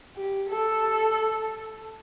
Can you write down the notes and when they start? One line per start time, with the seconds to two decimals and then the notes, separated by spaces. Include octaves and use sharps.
0.17 G4
0.49 A4